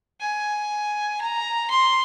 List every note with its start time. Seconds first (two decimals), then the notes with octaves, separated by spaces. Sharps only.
0.20 G#5
1.21 A#5
1.70 C6